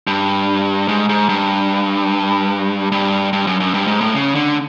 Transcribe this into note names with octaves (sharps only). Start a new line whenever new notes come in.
G2
G#2
G#2
G2
G2
G2
F#2
F#2
G2
G#2
A2
C#3
D3